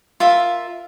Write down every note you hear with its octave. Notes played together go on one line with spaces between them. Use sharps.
F4 A#4 E5